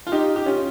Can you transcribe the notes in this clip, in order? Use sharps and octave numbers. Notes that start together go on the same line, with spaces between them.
F4
D#4 G4
G4
C#4 F4